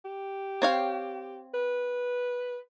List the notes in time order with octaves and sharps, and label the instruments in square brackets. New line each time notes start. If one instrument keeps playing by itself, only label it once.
[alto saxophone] G4
[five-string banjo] C4 C#5 F5
[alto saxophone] B4